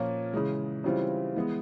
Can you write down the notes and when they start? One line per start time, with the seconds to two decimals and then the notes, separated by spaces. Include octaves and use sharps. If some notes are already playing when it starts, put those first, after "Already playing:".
Already playing: A#2 F3 A#3 C#4
0.33 C#3 E3 G#3
0.84 C#3 E3 G3 C4 F4
1.36 E3 G#3 B3